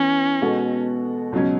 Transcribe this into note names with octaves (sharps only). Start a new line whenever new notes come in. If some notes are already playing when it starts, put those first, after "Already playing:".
Already playing: E3 B3 C#4 E4
B2 G#3 B3 F#4 A4
C#2 B2 F#3 C#4